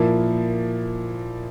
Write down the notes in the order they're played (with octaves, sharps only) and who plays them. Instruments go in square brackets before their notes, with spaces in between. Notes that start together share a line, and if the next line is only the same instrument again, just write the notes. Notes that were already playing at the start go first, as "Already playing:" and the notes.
Already playing: [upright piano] A#2 F3 A#3 E4